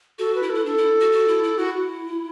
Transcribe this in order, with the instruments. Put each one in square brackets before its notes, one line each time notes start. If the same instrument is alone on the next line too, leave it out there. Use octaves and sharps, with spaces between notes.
[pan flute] F#4 [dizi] A4
[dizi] B4
[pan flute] E4
[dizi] A4
[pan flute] E4
[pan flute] D4 [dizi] A4
[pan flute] E4
F#4
F#4
E4
E4
[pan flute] E4 [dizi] F#4